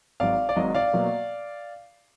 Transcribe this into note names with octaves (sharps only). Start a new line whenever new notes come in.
G#1 G#2 F#3 D5 F5
D5
G#1 G#2 F#3 D#5
D5 F5
B2 F#3 A#3